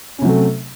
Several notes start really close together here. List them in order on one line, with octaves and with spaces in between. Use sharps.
C#4 C3 F#3 A3